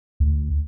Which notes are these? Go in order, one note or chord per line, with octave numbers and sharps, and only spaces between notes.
D2